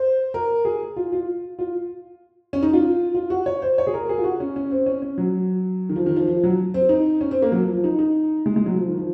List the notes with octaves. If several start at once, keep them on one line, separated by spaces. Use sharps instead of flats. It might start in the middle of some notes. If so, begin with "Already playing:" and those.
Already playing: C5
A#4
G#4
F4
F4
F4
C#4
D#4
F4
F4
F#4
C#5
C5
C#5
G#4
A#4
G#4
F4
F#4
C#4
C#4
C4
C#4
C#4
F#3
D#3
F3
D#3
F3
F3
F#3
C4
D#4
C#4
C4
A#3
F#3
F3
F3
D#4
D#4
G#3
G#3
F#3
F3
D#3
F3